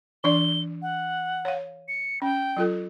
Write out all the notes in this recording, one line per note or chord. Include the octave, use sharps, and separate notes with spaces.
E3 D4 D5 G7
F#5
C#5 F5
C#7
C#4 G5
F#3 F4 A4